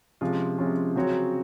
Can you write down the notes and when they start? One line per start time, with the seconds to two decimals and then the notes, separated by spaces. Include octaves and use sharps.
0.21 C3 F3 G#3 C#4 F4
0.58 C3 F3 G#3 C#4 F4
0.96 C#3 F#3 C4 F#4 C#5